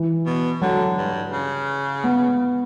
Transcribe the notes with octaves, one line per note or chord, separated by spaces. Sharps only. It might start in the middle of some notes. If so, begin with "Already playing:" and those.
Already playing: E3
B2
D3 F#3
G2
C#3
B3